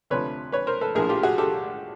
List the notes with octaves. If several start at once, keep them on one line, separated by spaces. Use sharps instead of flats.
D2 C3 F3 B4 C#5
B4 C#5
A#4 C5
A4 B4
A#1 A2 F3 G#4 A#4
F4 G4
F#4 G#4
G4 A4